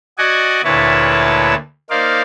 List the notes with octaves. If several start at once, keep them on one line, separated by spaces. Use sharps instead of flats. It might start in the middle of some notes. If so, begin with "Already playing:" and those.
F#4 D5 D#5 F#5 G#5
D2 A#2 E4 B4 C#5 A5
A#3 D#4 C5 D5 F5